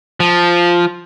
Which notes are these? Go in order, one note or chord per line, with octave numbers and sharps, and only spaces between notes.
F3